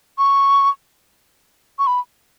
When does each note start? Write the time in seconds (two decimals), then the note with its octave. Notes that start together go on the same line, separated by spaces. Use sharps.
0.18 C#6
1.79 C#6
1.87 B5